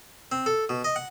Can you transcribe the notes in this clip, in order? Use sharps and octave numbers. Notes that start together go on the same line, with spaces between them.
C4
A4
B2
D#5
F#5